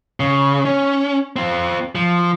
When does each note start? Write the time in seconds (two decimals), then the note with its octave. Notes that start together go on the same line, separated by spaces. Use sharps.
0.20 C#3
0.65 C#4
1.36 C4 F4
1.95 F3